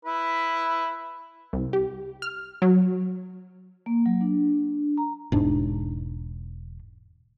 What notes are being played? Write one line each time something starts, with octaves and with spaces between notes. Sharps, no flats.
E4 B4
C2
G4
F6
F#3
A#3
F#3
D4
A#5
E1 G#2 D4